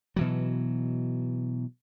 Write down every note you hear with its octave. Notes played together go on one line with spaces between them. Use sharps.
B2 E3 F#3